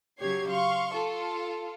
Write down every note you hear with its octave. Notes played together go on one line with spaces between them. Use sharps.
C#3 F#3 G4 C#5 G#6 C7
F5 C6 C#6
F4 A4